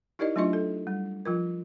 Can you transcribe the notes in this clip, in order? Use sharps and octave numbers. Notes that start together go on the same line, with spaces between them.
D#4 E4 G4 A#4 D5 D#5
F#3 A3 D4 F4 D#5 C#6
A4
G3
F3 F4 A#4